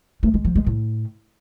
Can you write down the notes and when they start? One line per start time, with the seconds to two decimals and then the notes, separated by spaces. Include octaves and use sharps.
0.23 A3
0.34 G#3
0.45 F3
0.56 G#3
0.66 A2